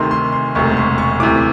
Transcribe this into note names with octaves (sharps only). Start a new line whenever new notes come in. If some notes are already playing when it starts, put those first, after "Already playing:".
Already playing: D2 C3 D#3 C6
C6
C6
E1 D2 C3 C#6
C6
C#6
D2 C3 E3 D6